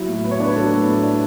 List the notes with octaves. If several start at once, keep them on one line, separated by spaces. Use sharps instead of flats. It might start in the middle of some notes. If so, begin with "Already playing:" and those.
Already playing: F#3 E4
A2
B3
C#5
D4 B4
F#3 A4
A2
B3
D4